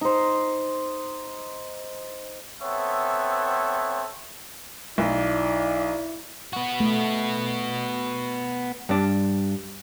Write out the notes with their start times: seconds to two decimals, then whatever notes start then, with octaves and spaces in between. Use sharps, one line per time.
0.01 D#4 C5
2.62 B3 C4 A4 C#5 E5
4.98 B1 E4 D5
6.53 B3 F#4
6.80 A3
8.89 G2 D4